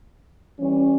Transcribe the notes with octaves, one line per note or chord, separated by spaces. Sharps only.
E3 G3 C#4